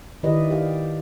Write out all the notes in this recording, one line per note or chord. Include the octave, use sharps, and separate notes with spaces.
D#3 E4 G4 B4 D5 D#5
G4 D5 F5